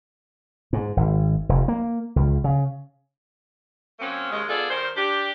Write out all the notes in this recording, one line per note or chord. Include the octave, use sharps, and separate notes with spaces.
G#2
G#1
F1
A#3
C#2
C#3
F#3 A#3 C4 C#4
D#2 C#3 G#3
B3 F4 G#4 A4 D5
D#3 G3 A#4 C5
D4 G4